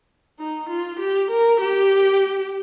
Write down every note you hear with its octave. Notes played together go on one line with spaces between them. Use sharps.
D#4
F4
G4
A#4
G4